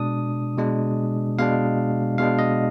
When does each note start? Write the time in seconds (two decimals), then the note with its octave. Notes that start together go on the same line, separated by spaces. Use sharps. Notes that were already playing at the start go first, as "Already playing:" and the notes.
Already playing: B2 G#3 D4 D#6
0.58 B2 G#3 D4
1.38 B2 G#3 D4 F5
2.18 B2 G#3 D4 F5
2.39 D#5